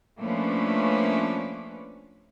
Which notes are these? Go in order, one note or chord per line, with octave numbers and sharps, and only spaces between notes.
F3 A3 A#3 C#4 D4 B4